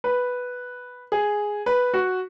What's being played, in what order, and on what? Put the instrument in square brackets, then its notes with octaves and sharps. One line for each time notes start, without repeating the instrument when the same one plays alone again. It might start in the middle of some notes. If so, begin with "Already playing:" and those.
[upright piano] B4
G#4
B4
F#4